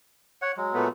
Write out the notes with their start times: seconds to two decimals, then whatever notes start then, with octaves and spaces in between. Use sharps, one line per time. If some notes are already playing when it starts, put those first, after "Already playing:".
0.42 C#5 F#5
0.57 F#3 G#3
0.74 A#2 A3 B3